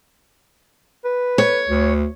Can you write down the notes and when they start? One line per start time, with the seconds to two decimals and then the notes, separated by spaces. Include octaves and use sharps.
1.05 B4
1.38 C#5
1.69 D2